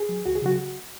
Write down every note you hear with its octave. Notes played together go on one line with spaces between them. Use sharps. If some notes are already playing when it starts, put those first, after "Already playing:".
Already playing: G#4
F#3
C#2 F#4
G#4
C#3 F#3 F#4